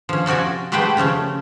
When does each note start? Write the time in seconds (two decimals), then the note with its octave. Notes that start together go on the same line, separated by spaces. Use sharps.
0.09 F3 C#4
0.26 C3 F3 F#4 D5 G#5
0.72 G#3 A3 G4 B4 C5 G5
0.97 C#3 F3 A3 C#4